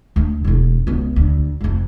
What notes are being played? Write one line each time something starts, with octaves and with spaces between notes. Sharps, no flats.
D2
E1 E4
C#2 B3
D2
F1 F2